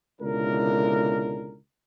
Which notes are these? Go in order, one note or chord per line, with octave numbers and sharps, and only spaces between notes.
C#2 B2 D3 E4 A#4